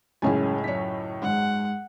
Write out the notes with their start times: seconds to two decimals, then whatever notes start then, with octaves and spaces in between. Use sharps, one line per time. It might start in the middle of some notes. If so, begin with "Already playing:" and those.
0.22 C#2 F#2 A2 G#3 C#4 G#4 G#5
0.64 F#2 C#5 B6
1.22 G#2 G#3 F#5